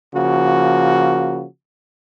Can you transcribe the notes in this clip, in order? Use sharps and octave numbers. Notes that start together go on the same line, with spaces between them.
C#3 F3 A#3 F#4